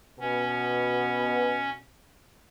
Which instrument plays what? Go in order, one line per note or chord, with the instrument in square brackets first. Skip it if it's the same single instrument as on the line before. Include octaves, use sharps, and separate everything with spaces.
[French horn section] B2 [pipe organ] C#4